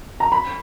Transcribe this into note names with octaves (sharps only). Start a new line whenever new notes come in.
A#5
B5